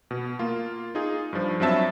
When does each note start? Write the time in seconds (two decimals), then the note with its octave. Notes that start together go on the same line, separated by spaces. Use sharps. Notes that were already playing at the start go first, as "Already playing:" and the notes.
0.11 B2
0.39 A#3 F4
0.95 D#4 F4 G#4
1.33 G2 F3
1.60 G2 F#3 C4 E5 A5 A6